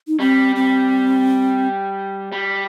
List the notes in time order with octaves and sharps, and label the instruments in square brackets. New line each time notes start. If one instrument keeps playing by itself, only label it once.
[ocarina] D#4
[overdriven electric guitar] G3 [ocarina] C4
[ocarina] C4
[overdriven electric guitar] G3